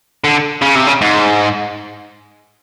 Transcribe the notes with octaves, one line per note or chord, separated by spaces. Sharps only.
D3
C#3
C3
C#3
G#2